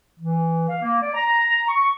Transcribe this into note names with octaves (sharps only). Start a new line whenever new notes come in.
E3
F5
A#3
D5
A#5
C#6